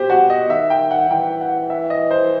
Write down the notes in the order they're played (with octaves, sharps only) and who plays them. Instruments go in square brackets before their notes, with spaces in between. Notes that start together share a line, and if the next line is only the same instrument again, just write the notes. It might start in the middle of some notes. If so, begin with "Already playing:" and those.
Already playing: [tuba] B2 [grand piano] G4 C5
[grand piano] F#4
D#5
[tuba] D#3 [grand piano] E5
[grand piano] G5
F#5
[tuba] E3 [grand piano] G5
[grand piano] F#5
E5
D#5
C5